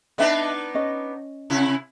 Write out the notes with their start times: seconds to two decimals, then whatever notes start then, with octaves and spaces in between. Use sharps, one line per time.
0.18 B3 D4 D#4 D#5 E5 A5
0.75 C#4 D#5
1.50 C3 E4